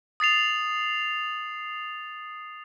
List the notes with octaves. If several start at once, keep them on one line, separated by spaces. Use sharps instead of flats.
D#6 A6 C7 F7